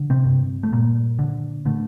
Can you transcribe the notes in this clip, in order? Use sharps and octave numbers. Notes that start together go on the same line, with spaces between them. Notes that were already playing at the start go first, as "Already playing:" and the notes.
Already playing: D3
C3 C4
G2
A3
G2 A#2 A#3
D3
A2 D3 A3